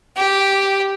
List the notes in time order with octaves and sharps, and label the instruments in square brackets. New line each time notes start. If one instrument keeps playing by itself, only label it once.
[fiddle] G4